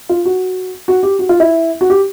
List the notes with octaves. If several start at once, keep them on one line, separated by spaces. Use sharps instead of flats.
F4
F#4
F#4
G4
F#4
F4
E4
F#4
G4